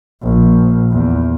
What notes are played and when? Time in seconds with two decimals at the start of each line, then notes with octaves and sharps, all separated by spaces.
0.22 A#1
0.91 E2